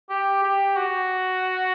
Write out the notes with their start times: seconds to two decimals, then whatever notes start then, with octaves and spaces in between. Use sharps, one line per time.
0.09 G4
0.43 G4
0.76 F#4